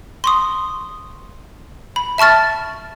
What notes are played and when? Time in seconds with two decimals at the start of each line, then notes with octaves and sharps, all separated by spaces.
0.24 C6 C#6 D#6
1.96 B5
2.18 E5 A5 C#6 F6 A6